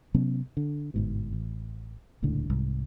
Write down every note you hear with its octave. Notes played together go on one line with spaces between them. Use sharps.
C3 F#3 B3 C#4
D3
G1 G#2 B2
A1
D#1 C#2 A2 D3
C2 G#2